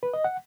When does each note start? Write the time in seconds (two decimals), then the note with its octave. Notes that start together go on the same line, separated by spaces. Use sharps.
0.03 B4
0.14 D#5
0.24 F#5